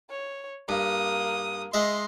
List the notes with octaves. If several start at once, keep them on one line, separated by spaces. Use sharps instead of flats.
C#5
G2 A#3 D#6
G#3 D#5 E5 C6